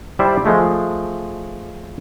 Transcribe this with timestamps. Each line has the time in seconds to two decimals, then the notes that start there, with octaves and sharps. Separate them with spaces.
0.19 G3 E4 C5 D5 E5
0.45 F3 G#3 A3